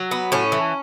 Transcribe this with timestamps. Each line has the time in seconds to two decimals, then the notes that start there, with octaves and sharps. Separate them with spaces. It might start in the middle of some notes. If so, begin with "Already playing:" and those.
Already playing: F#3
0.11 B3
0.32 A2 C#4
0.52 E3